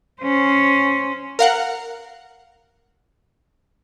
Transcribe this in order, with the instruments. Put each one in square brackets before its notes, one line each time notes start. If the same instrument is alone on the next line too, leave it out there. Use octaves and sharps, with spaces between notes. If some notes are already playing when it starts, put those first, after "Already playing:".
[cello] C#4 C5
[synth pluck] A#4 F5 F#5